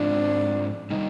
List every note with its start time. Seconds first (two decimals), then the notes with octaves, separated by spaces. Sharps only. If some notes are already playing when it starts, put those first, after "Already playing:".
Already playing: G#2 F3 C4 D4 F4
0.90 C3 D#3 G3 D#4